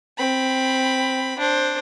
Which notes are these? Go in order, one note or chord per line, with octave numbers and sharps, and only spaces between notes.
C4 B5
D4 C5